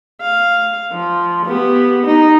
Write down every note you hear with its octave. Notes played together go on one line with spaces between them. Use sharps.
F5
F3
B3 G4
D#4